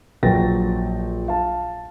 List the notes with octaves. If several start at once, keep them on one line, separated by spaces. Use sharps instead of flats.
A#1 F#3 B4 G5 A6 A#6
F5 A5